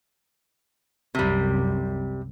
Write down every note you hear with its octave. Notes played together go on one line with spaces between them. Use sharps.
C2 F#2 C3 G3